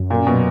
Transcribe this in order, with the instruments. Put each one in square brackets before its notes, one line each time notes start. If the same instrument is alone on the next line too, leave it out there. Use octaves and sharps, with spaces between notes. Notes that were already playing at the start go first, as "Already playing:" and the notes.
Already playing: [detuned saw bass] F#2
[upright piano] A#2
B2